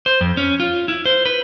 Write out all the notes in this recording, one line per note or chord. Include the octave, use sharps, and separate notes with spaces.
C5
F2
C#4
F4
E4
C5
B4